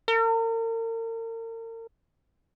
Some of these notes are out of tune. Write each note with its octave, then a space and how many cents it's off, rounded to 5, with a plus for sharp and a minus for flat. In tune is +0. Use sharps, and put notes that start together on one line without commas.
A#4 -40